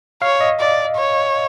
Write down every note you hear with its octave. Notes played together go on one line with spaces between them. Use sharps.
C#5 F5
D#5
D5
C#5